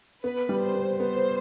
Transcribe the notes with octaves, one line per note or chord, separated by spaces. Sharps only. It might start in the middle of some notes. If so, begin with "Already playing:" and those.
B3 B4
G3
C5
B3
B3 C5